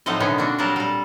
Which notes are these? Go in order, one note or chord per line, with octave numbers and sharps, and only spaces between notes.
A2 F3 F#3 C4 D#4 D#5
B2 D3 D#3 B3 C#4
A#3 C4 D4 F#4
A#2 F#3 G3 A#4 A5
G3 A4